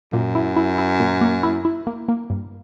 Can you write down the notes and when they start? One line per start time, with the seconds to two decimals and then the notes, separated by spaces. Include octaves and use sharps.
0.12 F#2 A#2
0.35 E4
0.57 E4
0.78 E4
1.00 A#2
1.21 A#3
1.43 E4
1.65 E4
1.87 A#3
2.09 A#3
2.30 G2